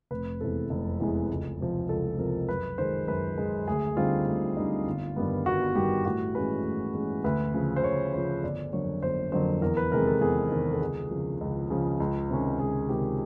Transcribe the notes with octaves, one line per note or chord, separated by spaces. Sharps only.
F1 B4
E2 C3 E3 G#3 A4
F1
E2 C3 E3 G#3
C#2
C3 F3
C#2 A4
C3 F3 A#4
F#2 B4
D#3 G#3 C5
F#2 B4
D#3 G#3
D2 G#4
D3 G3 C4 D#4 F4
D2
D3 G3 C4 D#4
G1
G2 D#3 G3 B3
G1 F#4
G2 D#3 G3 B3 G4
A2 F#4
E3 G#3 C#4 B4
A2
E3 G#3 C#4
D2 B4
C#3 F3
C5
D2 C#5
C#3 F3 C#5
G1 D5
F2 D3 F#3 A#3 C#5
G1 C5
F2 D3 F#3 A#3 C5
E2 A#4
B4
C3 D#3 G#3 C4 A#4
A4
E2 G#4
C3 D#3 G#3 C4
A4
C#2 G#4
C#3 F3
C#2
C#3 F3
C#2
C3 D#3 G#3 C#4
C#2 G#4
C3 D#3 G#3 C#4 G4